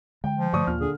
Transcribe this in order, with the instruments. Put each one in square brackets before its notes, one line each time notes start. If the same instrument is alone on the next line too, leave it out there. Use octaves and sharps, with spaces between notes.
[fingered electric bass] D3 G#3 [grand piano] G5
[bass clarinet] F3
[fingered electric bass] G2 D3 A3 [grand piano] D5 C#6 D#6
[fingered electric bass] D#2 [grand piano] A#2 F6
[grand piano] D3 [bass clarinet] G#4